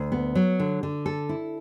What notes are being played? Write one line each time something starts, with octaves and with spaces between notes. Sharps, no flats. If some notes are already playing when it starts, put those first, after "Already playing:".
Already playing: D2
B3
F#3
D3
D3
A4
E4